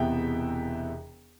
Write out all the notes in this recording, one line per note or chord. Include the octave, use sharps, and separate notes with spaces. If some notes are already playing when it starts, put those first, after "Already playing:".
Already playing: E1 E2 C3 E3 B3 E5 G5